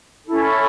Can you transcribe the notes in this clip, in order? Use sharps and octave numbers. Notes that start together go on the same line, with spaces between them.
C#4 E4 A4